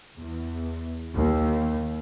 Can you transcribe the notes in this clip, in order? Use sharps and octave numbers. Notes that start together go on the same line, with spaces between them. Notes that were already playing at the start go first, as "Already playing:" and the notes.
E2
D#2